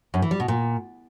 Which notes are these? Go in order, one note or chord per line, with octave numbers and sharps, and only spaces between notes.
F#2
E3
G3
B2
A#2